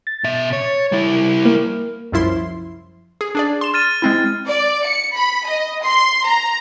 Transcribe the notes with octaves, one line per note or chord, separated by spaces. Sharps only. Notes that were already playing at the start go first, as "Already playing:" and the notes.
A6
B2 E5
C#5
G3 E4
A#3
C2 F#2 F3 E4 C6
G#4
D4 G#4 D5
C6 E7
F6 A6 D#7
G#3 C4 E4
D5
C#7
B5
D#5
C6
A#5